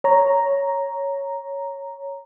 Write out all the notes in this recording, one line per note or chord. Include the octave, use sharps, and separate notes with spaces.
C#5 A#5